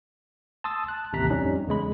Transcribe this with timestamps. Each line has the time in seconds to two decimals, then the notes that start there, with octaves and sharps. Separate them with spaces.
0.64 A5 C6 D#6 E6 A6
0.88 A5 F#6
1.13 A1 D#2 C3 A#5 F#6 B6
1.30 F2 G3 C#4 D#4
1.67 E2 C#3 G#3 B5